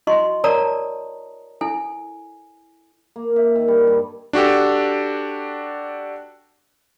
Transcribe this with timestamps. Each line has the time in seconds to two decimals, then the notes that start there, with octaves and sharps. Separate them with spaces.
0.07 E4 F#4 D#5 C6 C#6
0.44 A#4 C#5 D5 A5 A#5 D#6
1.61 E4 A4 G#5
3.16 A#3
3.36 E5
3.56 D#3
3.68 G3
3.87 G2
4.33 D4 F#4 G4 A4